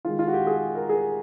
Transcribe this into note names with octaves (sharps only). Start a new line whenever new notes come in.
D#3 G#3 F4
F4
F#4
G4
G#4
A#4
G#4